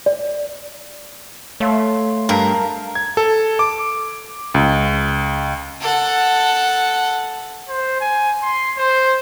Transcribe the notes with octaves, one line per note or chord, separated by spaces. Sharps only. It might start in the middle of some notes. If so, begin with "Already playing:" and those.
D5
A3 C#5 F5 C6
G2 A#4 F5 A5
G#6
A4
D6
C#2
A4 F#5
C5
G#5
C6
C5